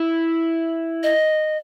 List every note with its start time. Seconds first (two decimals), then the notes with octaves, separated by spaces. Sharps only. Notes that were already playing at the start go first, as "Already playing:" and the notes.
Already playing: E4
1.03 D#5